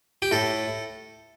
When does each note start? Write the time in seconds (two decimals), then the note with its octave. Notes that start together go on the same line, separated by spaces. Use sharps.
0.22 G4
0.31 A2 A4